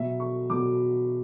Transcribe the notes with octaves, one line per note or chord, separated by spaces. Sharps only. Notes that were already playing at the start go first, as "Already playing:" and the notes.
Already playing: B2 F#3 E5
C#6
B2 F#3 D6